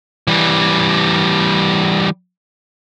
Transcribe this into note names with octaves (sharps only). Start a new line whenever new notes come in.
E3 G3